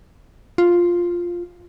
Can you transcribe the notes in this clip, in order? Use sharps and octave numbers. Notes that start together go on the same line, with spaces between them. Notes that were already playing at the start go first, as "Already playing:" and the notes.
F4